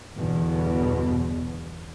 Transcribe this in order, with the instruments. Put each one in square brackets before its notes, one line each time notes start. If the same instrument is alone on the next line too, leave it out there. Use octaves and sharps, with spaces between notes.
[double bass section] G1 E2 B2